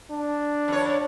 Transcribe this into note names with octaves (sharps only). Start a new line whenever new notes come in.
D4
F2 C#5